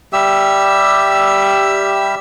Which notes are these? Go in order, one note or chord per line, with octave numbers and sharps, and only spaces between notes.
G3 G4 E5 E6